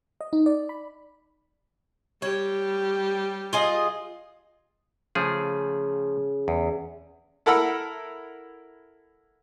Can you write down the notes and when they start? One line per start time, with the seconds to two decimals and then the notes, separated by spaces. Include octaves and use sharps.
0.21 D#5
0.33 D#4
0.46 D5
0.69 B5
2.22 G3 G4 C#5
3.53 F4 G#4 D#5
5.15 C#3 F3 A3 G#4
6.48 E2
7.46 E4 A4 A#4 F#5 B5 E6